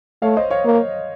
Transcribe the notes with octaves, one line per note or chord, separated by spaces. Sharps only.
A3 C#5 F5
C5 D#5
C#5 F5
A#3